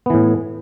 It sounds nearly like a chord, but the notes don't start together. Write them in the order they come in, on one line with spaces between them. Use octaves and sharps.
B3 E3 A2